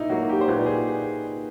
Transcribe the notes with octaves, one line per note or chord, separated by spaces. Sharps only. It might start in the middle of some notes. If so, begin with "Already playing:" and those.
Already playing: A#2 D#4 E4
F#3 A#3 F#4
G4
C5
A#2 B4
G#4